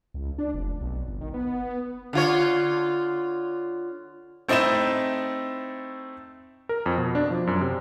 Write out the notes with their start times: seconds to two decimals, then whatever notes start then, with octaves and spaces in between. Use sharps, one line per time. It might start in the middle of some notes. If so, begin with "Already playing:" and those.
0.14 C#2
0.38 D4
0.54 F1
0.81 B1
1.08 G1
1.21 D#3
1.34 B3
2.13 D3 F4 C#5
4.48 A3 C4 D#4 E4 B5 E7
6.69 A#4
6.86 F2
6.98 B2
7.15 D4
7.30 F3
7.47 F#2
7.61 C3